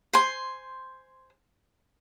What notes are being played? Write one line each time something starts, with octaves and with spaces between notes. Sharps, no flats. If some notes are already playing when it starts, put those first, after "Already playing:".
C5 G#5 C6